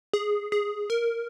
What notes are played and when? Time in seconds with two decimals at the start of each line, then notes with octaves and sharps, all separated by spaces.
0.13 G#4
0.52 G#4
0.90 A#4